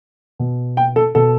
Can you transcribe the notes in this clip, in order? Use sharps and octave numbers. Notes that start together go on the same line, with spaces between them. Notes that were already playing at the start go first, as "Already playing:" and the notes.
B2
G5
A4
B2 A4